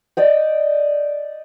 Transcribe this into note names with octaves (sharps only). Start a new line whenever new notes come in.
D5 D#5 G5